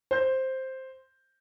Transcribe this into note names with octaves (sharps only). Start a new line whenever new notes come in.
C5 G6